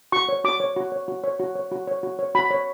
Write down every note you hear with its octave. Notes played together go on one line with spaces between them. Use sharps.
F#4 C#6
C#5
F#4 D6
C#5
F#4
C#5
F#4
C#5
F#4
C#5
F#4
C#5
F#4
C#5
F#4 B5
C#5